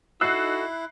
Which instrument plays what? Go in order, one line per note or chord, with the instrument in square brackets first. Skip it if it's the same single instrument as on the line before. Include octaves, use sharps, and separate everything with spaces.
[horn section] D#4 F#4 [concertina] E4 [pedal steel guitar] A4 E6 [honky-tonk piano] F#6 C7